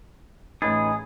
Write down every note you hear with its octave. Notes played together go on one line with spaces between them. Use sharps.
A1 D#4 G#4 B4 A6